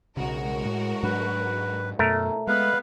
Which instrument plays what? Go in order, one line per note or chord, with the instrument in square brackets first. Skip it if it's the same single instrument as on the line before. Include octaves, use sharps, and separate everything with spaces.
[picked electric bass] B1 C#3 [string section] G#3 F#4 A#4
[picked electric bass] A2
[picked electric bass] G#2 F#3 D4 [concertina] B4
[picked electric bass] F#2 B2 [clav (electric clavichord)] A3 A#4
[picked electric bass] G#3 [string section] B3 [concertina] B4 F5